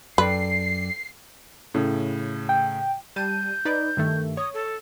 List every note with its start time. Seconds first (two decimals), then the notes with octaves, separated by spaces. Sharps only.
0.18 F#2 A4 B4 D5 G5 C7
1.74 A2 C#3
2.49 G5
3.16 G3 A5 G6 D#7
3.65 D#4 B4 D5
3.97 G2 D#3 A3
4.37 C#5 D#6
4.54 A4